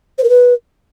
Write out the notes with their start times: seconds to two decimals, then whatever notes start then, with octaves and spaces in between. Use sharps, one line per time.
0.18 C5
0.23 A#4
0.29 B4